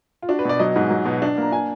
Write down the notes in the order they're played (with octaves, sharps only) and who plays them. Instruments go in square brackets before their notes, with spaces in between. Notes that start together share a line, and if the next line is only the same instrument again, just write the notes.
[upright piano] F4
D4 F#4
B4
B2 D5
F#3 D#5
G#2
F#3
B2
D4
A#3 A#5
D4 G#5